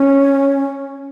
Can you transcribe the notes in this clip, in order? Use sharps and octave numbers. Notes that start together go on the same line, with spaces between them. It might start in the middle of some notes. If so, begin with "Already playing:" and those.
Already playing: C#4